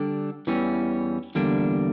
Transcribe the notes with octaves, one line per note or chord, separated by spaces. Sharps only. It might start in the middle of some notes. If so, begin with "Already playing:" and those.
Already playing: D3 G3 D4 A4
E2 E3 G3 C#4
E2 D3 G3 A#3 D4